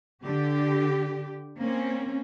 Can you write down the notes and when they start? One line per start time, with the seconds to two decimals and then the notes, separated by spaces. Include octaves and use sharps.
0.25 D3 G4
1.59 A#3 C4 C#4